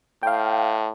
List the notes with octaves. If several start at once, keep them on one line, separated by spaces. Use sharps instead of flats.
A2 F5 G5